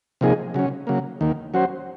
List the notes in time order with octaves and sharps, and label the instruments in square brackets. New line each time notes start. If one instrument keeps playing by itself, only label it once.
[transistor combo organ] C3 F3 A#3 D#4 G#4
C#3 F#3 C#4
C#3 F#3 A#3
D#2 D#3 A#3
F#3 C#4 F#4 C5